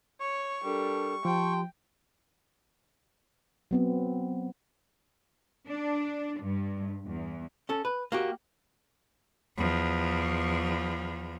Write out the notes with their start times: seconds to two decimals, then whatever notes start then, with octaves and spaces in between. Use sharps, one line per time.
0.20 C#5 C#6
0.64 G3 D4 A4 A#4
1.25 F3 G4 G5 A5 C6
3.71 F#3 B3 C4
5.67 D4
6.42 G2
7.06 E2
7.69 C#4 A4
7.85 B4
8.12 A#3 F#4 G4
9.57 E2 F3